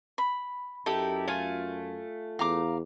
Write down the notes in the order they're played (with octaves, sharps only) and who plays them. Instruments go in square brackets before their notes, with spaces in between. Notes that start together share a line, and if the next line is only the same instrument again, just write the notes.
[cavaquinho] B5
[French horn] F#2 [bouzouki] D#4 E4 G4 [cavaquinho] A4
[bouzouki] A3 F4 G#5
[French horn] E2 [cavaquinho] F5 A#5 D6